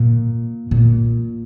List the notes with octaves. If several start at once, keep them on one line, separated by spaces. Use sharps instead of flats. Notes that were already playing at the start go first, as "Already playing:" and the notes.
Already playing: A#2
A#2